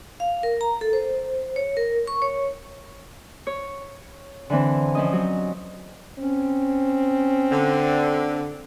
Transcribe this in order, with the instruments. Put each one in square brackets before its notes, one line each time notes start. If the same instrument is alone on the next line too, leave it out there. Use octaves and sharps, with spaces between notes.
[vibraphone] F5
A#4
A#5
A4
C5
C#5
A#4
C#6
C#5
[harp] C#5
D3 E3 C4
F3 C#4 D#5
F#3
[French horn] C4 [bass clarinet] C#4
[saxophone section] D3